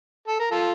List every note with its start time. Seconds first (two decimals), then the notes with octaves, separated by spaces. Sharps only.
0.28 A4
0.40 A#4
0.51 F4 A4